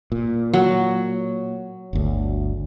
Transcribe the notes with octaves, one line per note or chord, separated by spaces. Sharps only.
A#2
F#3
G1 D2